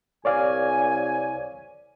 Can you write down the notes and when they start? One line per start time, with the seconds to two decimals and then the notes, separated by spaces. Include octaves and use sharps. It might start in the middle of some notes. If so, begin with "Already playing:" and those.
0.25 C2 C#5 D5 F5 G#5